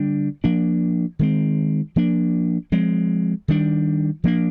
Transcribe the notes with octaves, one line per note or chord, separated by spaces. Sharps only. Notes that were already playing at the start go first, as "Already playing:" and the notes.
Already playing: D3 G3 D4
F3 A#3 D4
D#3 G#3 C4
F3 A#3 D4
F3 G#3 C4
D#3 G3 D4
F3 A#3 D4